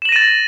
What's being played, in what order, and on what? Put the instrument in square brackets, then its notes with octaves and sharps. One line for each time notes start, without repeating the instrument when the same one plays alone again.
[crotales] E7
F#7
A#6
D#7
A6